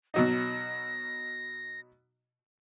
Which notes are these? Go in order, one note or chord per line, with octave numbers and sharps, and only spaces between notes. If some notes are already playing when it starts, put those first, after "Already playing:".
B2 F#3 D#4 A#6